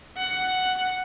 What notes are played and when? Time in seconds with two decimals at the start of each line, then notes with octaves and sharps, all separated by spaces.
0.17 F#5